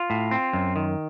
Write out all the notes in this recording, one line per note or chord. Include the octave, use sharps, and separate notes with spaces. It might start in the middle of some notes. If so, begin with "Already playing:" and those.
Already playing: F4
A2
C4
F#2
D#3